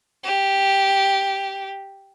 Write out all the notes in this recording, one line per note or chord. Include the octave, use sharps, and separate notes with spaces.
G4